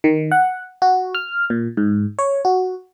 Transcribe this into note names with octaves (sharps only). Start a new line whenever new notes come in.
D#3
F#5
F#4
F6
A#2
G#2
C#5
F#4